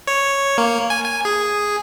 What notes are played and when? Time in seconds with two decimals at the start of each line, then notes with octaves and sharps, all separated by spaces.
0.08 C#5
0.58 A#3
0.90 G#5
1.05 G#5
1.25 G#4